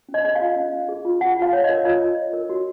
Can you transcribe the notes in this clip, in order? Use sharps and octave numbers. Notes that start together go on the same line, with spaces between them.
C#4
D#5
G#4 D#5
F5
F4
C#4
C#4
G#4
F4
F4 F#5
F4
F5
C#5
D#5
A#4
F4 D#5
F4
C#5
A#4
F#4